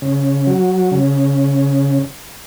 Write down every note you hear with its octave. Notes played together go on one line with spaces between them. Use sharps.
C#3
F#3
C#3